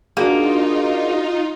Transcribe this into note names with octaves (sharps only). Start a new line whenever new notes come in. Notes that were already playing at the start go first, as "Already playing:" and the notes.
A#3 D4 D#4 F4 F#4 G#4